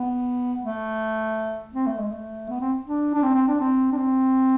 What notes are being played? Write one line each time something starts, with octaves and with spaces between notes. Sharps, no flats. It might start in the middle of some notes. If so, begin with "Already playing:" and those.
Already playing: B3
A3
C4
A3
G#3
A3
B3
C4
D4
D4
C4
C4
D4
C4
D4
C4